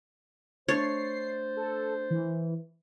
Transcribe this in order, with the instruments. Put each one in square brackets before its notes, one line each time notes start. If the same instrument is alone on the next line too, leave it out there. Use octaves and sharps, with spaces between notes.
[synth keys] A3 D4 A6 [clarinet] C5 [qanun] C#5 [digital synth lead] C7
[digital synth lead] A4
E3